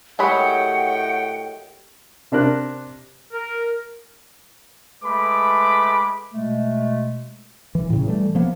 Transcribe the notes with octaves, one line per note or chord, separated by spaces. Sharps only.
A2 F#3 G#3 G4 A#4 F#5 G5 B5
C3 D4 A#4 F#6
A#4
G#3 A3 B4 B5 D6
B2 G#3 A3
E3
A2 C#3
E3 G3 A3
F3 A#3 B3